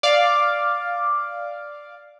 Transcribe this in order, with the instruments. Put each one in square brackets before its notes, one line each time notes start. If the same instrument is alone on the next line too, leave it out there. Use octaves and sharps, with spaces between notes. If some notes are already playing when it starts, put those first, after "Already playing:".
[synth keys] D5 F5 D6